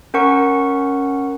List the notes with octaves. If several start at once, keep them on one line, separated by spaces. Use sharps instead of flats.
C#4 A#4 F#5 C#6